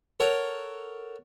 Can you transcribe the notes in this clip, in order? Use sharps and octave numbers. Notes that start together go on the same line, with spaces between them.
A4 A#4 C#5 F#5